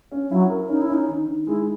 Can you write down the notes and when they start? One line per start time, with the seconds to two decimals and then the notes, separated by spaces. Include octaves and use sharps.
0.12 C#4
0.30 F#3 E4
0.49 A#4
0.69 C#4 D#4
0.82 E4
0.89 C#4
0.94 D#4
1.08 D#3
1.27 D#3
1.46 G#3 E4